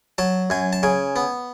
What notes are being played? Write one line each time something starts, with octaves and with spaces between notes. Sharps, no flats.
F#3 A5
F#2 G#5
A5
C#3 G#5
B3